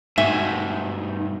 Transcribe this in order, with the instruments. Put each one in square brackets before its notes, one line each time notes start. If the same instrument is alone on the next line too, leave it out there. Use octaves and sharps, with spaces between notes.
[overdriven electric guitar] G2 B2 [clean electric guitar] D#4 G#5 [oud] E5